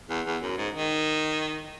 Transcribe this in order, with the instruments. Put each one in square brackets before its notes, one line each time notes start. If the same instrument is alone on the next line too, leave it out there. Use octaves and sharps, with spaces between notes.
[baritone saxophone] E2
E2
F#2
G#2
D#3